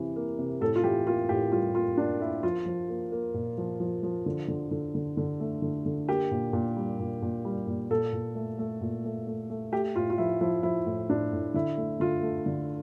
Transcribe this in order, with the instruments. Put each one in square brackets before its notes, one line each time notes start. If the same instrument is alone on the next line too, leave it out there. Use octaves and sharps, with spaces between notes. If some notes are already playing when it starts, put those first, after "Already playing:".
Already playing: [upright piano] C3 E3
A#3
C3
A2 A4
F4
E3 G4
A#3 F4
A2 G4
G3 F4
A#3 F4
A#3 D4
A#3 E4
F3 F4
F3
A#3
A#3
A#2
F3
F3
F3
D3
D3
D3
D3
D3
A3
D3
D3
A#3 G4
A#2
A#2
G3
A#2
A#2
G3
A#2
A#2 A4
A#2
A3
A3
A#2
A3
A3
A3
A3 G4
A2 F4
F4
F3 E4
F3 E4
F3 E4
A2
A2 D4
A2
D3 E4
A3
D3 F4
A3
D3